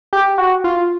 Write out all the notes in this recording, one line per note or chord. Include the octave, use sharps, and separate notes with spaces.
G4
F#4
F4